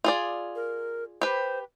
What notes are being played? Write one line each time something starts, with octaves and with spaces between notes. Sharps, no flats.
F4 G#4 D5
A#4
G4 B4 C5